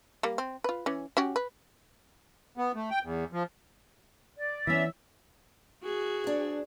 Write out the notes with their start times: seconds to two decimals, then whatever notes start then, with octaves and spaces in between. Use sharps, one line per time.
0.23 G3 A#3
0.38 C4
0.64 F4 B4
0.86 E3 C#4
1.17 C#4 F#4 G4
1.36 B4
2.57 B3
2.75 A3
2.91 G5
3.03 E2
3.32 F3
4.36 D5
4.67 E3 B3 C#4 E5
5.83 F#4 G#4
6.24 D2 D4